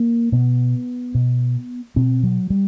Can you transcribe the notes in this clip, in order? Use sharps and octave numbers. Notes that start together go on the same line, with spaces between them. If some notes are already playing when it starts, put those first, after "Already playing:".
Already playing: A#3
B2 B3
B2
B2 C4
F#3
G3